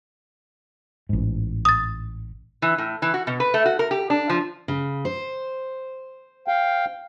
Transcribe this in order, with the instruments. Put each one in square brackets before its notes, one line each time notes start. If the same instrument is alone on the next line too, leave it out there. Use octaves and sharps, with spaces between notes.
[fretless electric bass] A1 G#2
[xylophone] D#6 A6
[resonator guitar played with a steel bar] E3
A2
E3
F#4
B2
B4
A3
F#4
A#4
G4
D4
F3
[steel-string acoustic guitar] C#3
C5
[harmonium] F5 G5